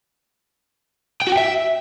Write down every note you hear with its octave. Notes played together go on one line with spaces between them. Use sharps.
G5
F#4
G5
E5